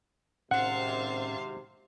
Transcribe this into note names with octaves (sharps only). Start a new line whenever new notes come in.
G#1 A2 C3 C#4 C5 F5 F#5